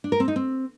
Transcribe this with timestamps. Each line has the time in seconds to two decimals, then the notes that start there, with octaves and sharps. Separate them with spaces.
0.04 D4
0.12 A#4
0.20 C4
0.28 D#4
0.36 C4